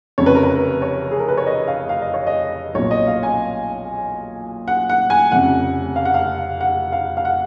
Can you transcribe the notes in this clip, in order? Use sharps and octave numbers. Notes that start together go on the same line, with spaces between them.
F1 F2 C#3 C#5
B4
A#4
B4
C#5
G#4
A#4
B4
C#5
D#5
F5
F5
D#5
C#5
D#5
B1 A#2 C#5
D#5
F5
G#5
F#5
F#5
G#5
F1 F2 C#3 F#5
F5
F#5
F5
F#5
F5
F5
F#5